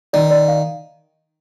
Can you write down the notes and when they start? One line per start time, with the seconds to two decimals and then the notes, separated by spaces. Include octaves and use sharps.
0.13 D#3 D5
0.31 D5
0.48 F5